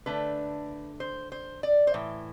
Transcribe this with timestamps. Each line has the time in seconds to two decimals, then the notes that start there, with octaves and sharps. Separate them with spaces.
0.06 D3 A3 D4 B4
1.00 C5
1.32 C5
1.63 D5
1.87 C5
1.94 A2 E3